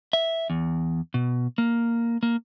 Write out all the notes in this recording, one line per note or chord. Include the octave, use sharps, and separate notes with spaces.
E5
E2
B2
A#3
A#3